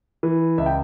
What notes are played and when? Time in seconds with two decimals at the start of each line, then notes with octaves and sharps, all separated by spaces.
0.23 E3
0.58 C#2 E5
0.66 G5